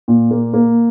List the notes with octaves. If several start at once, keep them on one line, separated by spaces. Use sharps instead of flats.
A#2
A#3
A#3